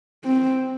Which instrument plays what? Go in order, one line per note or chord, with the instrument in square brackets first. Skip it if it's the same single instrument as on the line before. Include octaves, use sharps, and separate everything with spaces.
[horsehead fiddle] C4